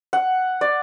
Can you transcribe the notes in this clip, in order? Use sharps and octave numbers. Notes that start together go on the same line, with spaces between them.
F#5
D5